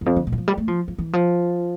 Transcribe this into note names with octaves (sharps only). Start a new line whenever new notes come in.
E2
F2
D3
A#2
E3
F3
G3
A3
F3
F3
E3
F3